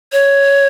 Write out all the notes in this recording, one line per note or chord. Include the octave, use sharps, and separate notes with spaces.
C#5